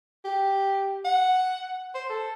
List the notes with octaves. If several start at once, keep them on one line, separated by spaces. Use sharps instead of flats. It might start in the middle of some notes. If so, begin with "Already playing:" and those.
G4
F#5
C5
A4